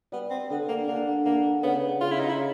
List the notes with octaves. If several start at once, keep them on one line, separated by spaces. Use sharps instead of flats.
G3 B3
C4
D3 B3
A#3
D3 A#3
D3 A#3
C#3 B3
C#3 F4
E4
D#4
E4